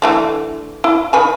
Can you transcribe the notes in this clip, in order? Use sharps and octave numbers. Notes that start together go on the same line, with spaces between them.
D3 E3 A3
E4
D#3 B4 G#5